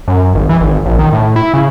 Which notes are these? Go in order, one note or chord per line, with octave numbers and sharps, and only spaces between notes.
F#2
G#1
E3
G#1
A#1
D#3
A2
E4
C#3